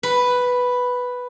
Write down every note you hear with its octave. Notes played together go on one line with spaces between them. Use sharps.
B4